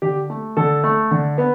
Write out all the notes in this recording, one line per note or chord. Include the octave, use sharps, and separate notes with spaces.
D3 G4
A3
D3 A4
A3
D3
B3